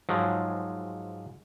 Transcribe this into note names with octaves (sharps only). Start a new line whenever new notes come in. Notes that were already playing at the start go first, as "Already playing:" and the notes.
G#2 F3 F#3 G#3